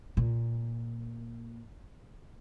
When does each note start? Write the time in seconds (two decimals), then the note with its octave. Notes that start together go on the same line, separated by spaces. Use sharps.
0.17 A#2